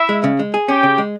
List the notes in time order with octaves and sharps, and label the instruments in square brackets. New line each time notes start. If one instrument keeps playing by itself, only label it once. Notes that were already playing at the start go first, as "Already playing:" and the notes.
Already playing: [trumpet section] E4 E5
[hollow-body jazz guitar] G#3
C#3
G#3
G#4
[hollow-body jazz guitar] C#4 [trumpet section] G4 G5
[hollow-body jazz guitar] C#3
G#3